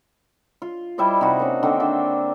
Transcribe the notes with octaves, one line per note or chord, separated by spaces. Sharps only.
F4
G3 E4 C5 D#5
C3 D#4 F#4
A#3 C#4
D3 D#3 A#3 C4
D4 C5 E5